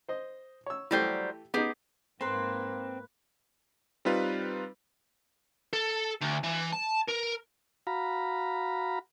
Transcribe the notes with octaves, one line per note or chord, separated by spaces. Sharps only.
C5 D#5
C#5 E6
E3 F#3 G3 A3 G4 C5
B3 D#4 G4 G#4
G#2 A#3 C4 B4 C6
G3 C4 D#4 F4 B4
A4
D2
E3
A5
A#4
F#4 F5 A#5 B5